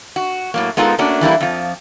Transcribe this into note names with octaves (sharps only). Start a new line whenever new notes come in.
F#4
A2 F#3 A#3
G#3 B3 D#4 F4 A4 A#4
A3 A#3 C#4 D4 F#4
E3 G3 A#3 E4
F2 F3